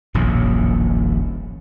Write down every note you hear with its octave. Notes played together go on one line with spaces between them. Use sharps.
D#1 A#1 F#2 A2